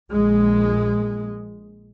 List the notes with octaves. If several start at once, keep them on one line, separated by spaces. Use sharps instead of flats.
A#1 G#3